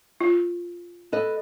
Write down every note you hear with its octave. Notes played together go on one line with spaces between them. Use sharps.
F4
A4 B4 D#5